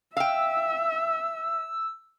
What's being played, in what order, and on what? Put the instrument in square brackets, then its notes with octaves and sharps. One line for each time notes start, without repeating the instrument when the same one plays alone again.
[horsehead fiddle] E5 [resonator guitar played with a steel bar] F5 G5 [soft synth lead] E6